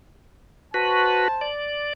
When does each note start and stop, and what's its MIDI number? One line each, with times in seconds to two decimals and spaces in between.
0.74 1.28 66
0.74 1.28 71
0.74 1.49 72
0.74 1.49 81
1.41 1.93 74